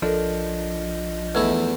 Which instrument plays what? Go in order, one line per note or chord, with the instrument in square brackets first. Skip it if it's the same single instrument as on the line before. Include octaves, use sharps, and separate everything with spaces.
[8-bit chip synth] A#1 D#5 [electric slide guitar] F3 D4 [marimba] A4 A#4
[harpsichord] E2 A3 E4 [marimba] G#6